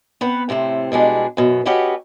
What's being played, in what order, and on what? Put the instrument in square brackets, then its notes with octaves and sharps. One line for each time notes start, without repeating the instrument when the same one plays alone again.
[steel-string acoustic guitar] B3 C4 B4 F#5
A2 C3 A3 C4
B2 G3 G#3 D4
F#2 B2
C#4 F#4 G4 A4 B4 D#5